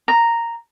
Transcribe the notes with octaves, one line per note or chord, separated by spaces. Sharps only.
A#5